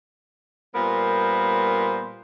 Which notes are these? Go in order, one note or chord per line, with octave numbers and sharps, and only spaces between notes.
A#2 G3 B3 A#4 C5